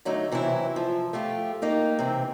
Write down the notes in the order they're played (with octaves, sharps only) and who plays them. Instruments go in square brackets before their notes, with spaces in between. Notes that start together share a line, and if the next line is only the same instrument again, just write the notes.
[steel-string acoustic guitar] D3 F#3 A3 D#4
C3 E3 F#3 C4 E4
F3
A3 F4 G4
A#3 D#4 G4
C3 E3 C4